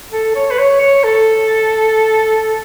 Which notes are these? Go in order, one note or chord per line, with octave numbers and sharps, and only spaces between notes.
A4
C#5
B4
C#5
C#5
A4